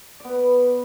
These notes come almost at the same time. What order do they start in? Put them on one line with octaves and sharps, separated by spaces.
D5 B3 B4